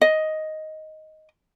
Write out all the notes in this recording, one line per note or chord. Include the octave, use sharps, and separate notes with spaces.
D#5